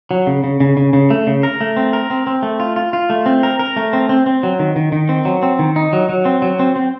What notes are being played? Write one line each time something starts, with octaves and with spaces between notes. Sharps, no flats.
F#3
C#3
C#3
C#3
C#3
C#3
A3
C#3
A#4
A3
C4
A#4
C4
C4
A3
F4
F4
F4
A3
C4
A#4
A#4
A3
C4
C4
C4
F#3
D#3
D#3
D#3
C4
F#3
C4
D#3
D#4
F#3
F#3
C4
F#3
C4
C4